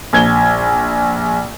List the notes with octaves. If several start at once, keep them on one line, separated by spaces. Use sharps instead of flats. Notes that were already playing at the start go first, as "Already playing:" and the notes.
A#1 G#6 G7